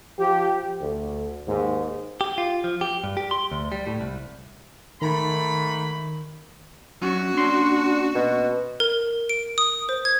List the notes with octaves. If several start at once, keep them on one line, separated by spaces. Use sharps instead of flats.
F3 G4
D2
D#2 G#2
G4
F4
F3
G4
G2
G4
C6
D2
G3
A2
C2
G#2 D#3 A3 B5
F#3 C#4 D4 F#4
A#3 C#4 D4 C6
B2
A#4
D7
D#6
C5
G#6